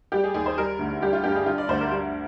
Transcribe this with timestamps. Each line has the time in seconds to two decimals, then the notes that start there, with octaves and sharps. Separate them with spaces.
0.12 G3 G4
0.24 G#4
0.34 D#2 G#4
0.46 C5
0.57 G3 A#4
0.79 D2
1.02 G3 G4
1.13 F4
1.24 G2 G4
1.35 G#4
1.46 G3 F4
1.58 D5
1.69 D2 C5
1.81 A#4
1.92 G3